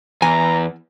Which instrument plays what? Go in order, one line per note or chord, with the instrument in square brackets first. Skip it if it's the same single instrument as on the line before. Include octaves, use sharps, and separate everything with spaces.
[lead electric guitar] E2 [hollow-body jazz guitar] G#5 [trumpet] A#5